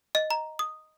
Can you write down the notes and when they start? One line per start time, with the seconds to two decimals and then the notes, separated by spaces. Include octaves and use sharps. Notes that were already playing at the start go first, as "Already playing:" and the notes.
0.15 D#5
0.30 A#5
0.59 D#6